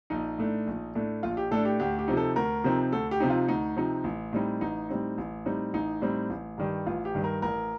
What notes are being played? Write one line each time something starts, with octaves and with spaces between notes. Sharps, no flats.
A#1 D#4
A2 A3 D4
A#1
A2 A3 D4
A#1 F4
G4
A2 A3 D4 A4
G4
D2 G4
G4
C3 F3 C4 D#4
A4
D2 A#4
C3 F3 C4 D#4
D2 A4
G4
C3 F3 C4 D#4
F4
D2 D#4
C3 F3 C4 D#4
A1
A2 G3 C4 D#4
A1 D#4
A2 G3 C4 D#4
A1
A2 G3 C4 D#4
A1 D#4
A2 G3 C4 D#4
A1
G2 D#3 G3
A1 F4
G4
G2 D#3 G3
A#4
A1 A#4